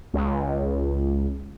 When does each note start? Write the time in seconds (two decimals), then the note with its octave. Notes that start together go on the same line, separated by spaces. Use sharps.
0.14 C#2